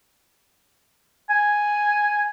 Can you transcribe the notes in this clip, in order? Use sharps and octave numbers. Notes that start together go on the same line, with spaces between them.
G#5